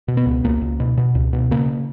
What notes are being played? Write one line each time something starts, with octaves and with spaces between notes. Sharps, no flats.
B2
B3
C#2
C#2 A#3
C#2
B2
B2
C#2
B2
C#3 A#3